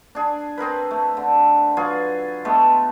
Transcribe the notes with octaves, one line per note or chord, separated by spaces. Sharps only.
D4 G#4
C4 G#4 A#4 B4
A3
D3
F#3 F4 G#4 B4
G#3 A3 B3 A4